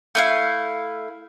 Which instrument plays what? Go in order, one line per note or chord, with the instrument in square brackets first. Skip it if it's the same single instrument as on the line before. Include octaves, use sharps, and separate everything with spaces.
[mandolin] A3 E4 F5